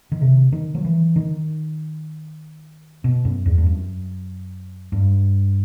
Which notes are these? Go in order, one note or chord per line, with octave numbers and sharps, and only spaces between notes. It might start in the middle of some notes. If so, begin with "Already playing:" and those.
D#3
C3
D#3
F#3
E3
D#3
B2
F#2
E2
G2
F#2
G2